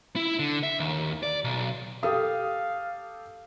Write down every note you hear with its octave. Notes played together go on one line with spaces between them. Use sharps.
E4
D3
E5
D#2
D5
B1
G4 A4 F5 D#6